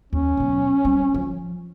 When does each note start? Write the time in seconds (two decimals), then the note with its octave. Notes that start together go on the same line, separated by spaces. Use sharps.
0.13 D#2 C#4
0.37 B2 F#3
0.85 G3 C4
1.14 F3